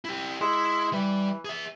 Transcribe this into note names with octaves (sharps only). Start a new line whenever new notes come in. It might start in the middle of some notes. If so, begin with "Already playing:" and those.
E4 G4
G#3 E4
E3 G3
G#4 E5